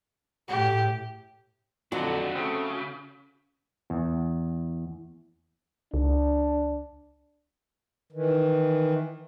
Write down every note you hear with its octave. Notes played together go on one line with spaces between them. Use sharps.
A2 G4
F2 D3 F#3 D4 F#4 A#5
C#3 A3 C4
E2
C#2 D4
D#3 E3